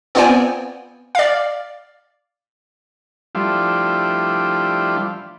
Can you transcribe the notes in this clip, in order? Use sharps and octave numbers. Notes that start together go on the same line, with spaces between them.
B3 C4 F4 D5 G5 G#5
D5 F5
F3 G3 A3 D4 E4 F4